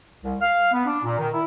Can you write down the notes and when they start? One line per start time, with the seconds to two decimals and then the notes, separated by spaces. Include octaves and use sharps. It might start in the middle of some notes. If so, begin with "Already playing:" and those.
0.23 C2
0.40 F5
0.72 B3
0.86 D4
1.03 A#2
1.18 D#3
1.33 E4